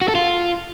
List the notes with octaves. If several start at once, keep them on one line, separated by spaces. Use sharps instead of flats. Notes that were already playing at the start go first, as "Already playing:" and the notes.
F#4
A4
F4